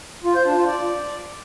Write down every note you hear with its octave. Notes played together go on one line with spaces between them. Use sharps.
F4
C5
D4
F4
D5